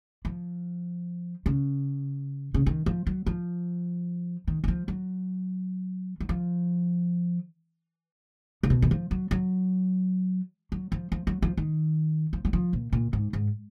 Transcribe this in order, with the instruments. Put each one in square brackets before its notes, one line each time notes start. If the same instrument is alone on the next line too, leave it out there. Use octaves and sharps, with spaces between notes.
[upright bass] F3
C#3
C#3
D#3
F3
F#3
F3
D#3
F#3
F3
F#3
F#3
F3
C#3
B2
D#3
F3
F#3
F#3
F#3
F3
F3
F#3
F3
D#3
F3
F#3
F3
A#2
A#2
G#2
G#2